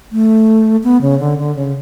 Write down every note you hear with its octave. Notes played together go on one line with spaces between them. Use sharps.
A3
B3
C#3
D3
D3
C#3